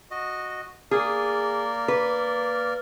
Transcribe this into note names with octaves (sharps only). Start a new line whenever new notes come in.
F#4 D#5
A#3 G#4 A#4 D5
B4